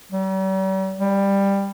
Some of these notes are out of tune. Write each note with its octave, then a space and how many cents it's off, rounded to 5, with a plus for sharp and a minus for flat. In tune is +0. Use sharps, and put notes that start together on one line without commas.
G3 -45
G3 +15